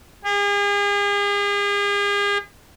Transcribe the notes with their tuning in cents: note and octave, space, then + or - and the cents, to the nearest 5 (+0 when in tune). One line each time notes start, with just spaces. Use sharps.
G#4 -40